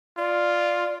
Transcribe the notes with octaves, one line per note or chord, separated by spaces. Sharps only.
F4 D5